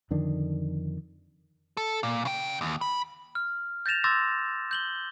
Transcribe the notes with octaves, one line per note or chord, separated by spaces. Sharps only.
F2 D3 D#3 D4
A4
A#2
C#3 G5
D#2
B5
F6
G6 A6 A#6 E7 F7
C6 D6 E6 G6 A6 A#6
G6 F#7 G7